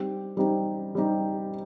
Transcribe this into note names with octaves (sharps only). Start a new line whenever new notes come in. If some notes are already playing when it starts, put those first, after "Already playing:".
Already playing: G3 C4 D#4 G4
G3 C4 D#4 G4
G3 C4 D#4 G4